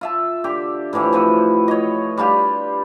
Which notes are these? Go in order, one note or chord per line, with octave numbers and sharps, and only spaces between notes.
F4 E5 A5
D3 G4
A2 E3 F3 G4
F3 C4 F#4 B4
C#5 D#5
G3 D4 F4 G4